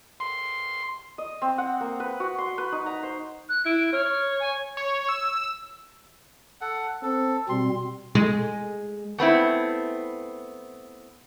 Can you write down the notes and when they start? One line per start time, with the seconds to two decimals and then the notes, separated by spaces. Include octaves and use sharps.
0.20 C6
1.18 D#5
1.42 C4
1.58 F#5
1.81 A#3
2.00 B4
2.20 F#4
2.38 C6
2.58 B4
2.72 D#4
2.86 A#5
3.03 C5
3.49 F#6
3.66 E4 D7
3.93 C#5 F6
4.40 G#5
4.77 C#5
5.09 E6
6.61 A4 F#5
7.03 C4 A4
7.49 B2 G3 C4 C6
8.15 G#3
9.18 A3 B3 C4 E4